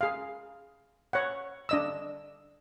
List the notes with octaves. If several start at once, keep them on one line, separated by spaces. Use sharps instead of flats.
G#4 F5
C#5 F#5
D4 D#5 E6